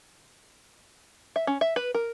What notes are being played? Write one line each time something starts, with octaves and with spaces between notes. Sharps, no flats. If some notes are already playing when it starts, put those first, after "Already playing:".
E5
C#4
E5
B4
A#4